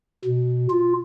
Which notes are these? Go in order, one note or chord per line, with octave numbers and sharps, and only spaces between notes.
B2
F4